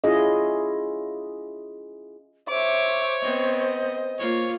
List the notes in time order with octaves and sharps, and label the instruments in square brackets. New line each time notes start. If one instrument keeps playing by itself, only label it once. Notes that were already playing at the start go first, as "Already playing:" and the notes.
[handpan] C#4 E4 F4 G#4 D#5
[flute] C5 [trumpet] C#5 [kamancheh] E5 D6
[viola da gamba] B3 C4 [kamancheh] D#5
[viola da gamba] A#3 F4 [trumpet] C#5